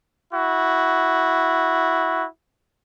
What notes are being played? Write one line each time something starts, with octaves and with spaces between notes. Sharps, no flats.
E4 F#4